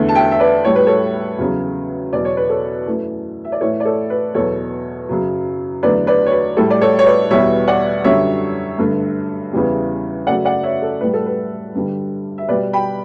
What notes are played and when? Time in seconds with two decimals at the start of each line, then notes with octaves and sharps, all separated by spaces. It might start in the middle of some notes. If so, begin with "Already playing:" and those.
Already playing: E2 D3 A3
0.09 A5
0.15 E5 G5
0.32 E5
0.40 B4 D5
0.65 A2 G3 C#5
0.76 B4
0.87 A4 C#5
1.39 E2 C#3 F#3
2.13 E2 B2 F#3 D5
2.25 C#5
2.37 B4
2.49 A4 C#5
2.87 F#2 E3 A3
3.45 E5
3.52 D5
3.61 A2 E3 A3 A4 C#5
3.80 D5
3.85 A4 C#5
4.10 B4
4.34 E2 B2 F#3 A4 C#5
5.09 F#2 C#3 F#3
5.83 E2 D3 F#3 A3 B4 D5
6.07 B4 D5
6.26 C#5
6.32 B4
6.57 A2 G3 A4
6.70 D5
6.81 A4 C#5
6.99 C#5
7.06 B4 D5
7.31 E2 B2 G3 C#5 E5
7.67 D5 F#5
8.04 F#2 D3 G3 C#5 E5
8.78 G2 D3 A3
9.53 E2 C#3 E3 G3
10.27 F#2 C#3 F#3 A3 D5 F#5
10.45 D5 F#5
10.63 C#5 E5
10.82 A4
11.01 A2 G3 B4
11.14 A4
11.26 B4
11.75 G2 D3 G3
12.38 E5
12.49 B2 G3 B4 D5
12.73 G5 B5